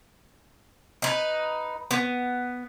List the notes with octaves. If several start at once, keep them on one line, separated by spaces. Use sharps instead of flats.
D#4 B4
B3